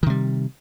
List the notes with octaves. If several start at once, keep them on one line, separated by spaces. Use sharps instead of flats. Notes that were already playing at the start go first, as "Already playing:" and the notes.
C3 D#3 G3